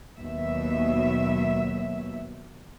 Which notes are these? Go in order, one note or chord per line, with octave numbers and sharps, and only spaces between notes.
D#2 B2 F#3 E5